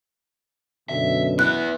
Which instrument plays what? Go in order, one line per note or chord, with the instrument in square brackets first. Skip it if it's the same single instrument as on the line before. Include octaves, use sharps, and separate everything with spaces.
[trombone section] F#2 B2 D3 [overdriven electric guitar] E5
[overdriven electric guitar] B3 E4 [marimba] F#6